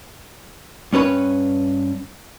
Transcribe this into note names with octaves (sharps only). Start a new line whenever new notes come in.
G2 C#4 B4 C#5